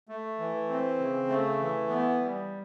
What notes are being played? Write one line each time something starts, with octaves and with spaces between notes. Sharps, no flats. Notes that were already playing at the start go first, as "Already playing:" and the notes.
A3
E3
C4
C#3
A3
E3
B3
G3